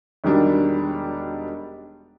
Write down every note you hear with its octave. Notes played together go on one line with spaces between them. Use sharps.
E1 D#3 F#3 G3 D4